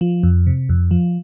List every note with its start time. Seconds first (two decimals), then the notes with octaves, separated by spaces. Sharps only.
0.01 F3
0.23 F2
0.47 C3
0.69 F2
0.91 F3